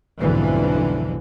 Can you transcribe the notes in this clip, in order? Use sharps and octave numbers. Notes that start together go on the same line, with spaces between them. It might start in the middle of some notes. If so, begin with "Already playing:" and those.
B1 F2 G#2 D3 E3